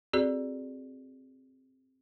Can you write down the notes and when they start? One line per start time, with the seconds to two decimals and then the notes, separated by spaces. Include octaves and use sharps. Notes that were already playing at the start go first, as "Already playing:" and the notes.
0.13 C4 F#4 G#4 A4 D5